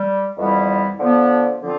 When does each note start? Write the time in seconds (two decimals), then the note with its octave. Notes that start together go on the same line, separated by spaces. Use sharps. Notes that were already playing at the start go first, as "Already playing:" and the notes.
Already playing: G3
0.37 F2 E3 G3 B3 E4
0.99 D3 F3 B3
1.62 D3 F3 C4 F4